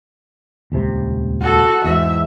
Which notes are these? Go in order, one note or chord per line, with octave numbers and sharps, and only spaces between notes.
D#1 C#2 C3
F#4 A4
E2 G#2 E5